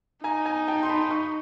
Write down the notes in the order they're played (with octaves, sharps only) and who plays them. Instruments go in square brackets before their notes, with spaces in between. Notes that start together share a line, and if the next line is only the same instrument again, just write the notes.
[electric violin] D#4 [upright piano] G#5 A#5
[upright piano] G#5 A#5
G5 A5
C6
A5 B5
B5 C#6